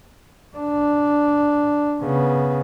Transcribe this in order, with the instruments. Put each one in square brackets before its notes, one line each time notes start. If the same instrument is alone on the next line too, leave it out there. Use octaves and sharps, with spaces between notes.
[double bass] D4
C#3 B3